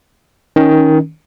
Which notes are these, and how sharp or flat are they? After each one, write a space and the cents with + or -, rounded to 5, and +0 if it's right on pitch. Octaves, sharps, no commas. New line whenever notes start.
D#3 +15 C#4 +10